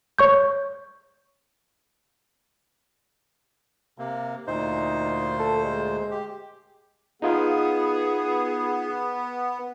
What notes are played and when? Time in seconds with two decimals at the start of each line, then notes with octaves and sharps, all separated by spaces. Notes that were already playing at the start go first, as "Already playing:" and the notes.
0.19 C#5 C#6 G6
3.98 C3 A#3
4.47 D2 A#2 D#4 C5
5.39 A4
5.65 G#3
6.11 G4
7.22 B3 D#4 F4 G#4